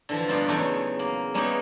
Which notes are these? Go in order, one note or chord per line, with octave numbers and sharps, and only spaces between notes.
D3 E3 F3
G2 A#2 B3 D4 D#4 F4
E2 C#3 F#3 A3 C#5 G5
A#3
G3 G#3 A#3 B3 C#4 D#4